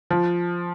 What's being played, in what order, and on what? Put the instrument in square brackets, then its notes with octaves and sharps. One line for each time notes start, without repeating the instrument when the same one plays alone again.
[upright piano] F3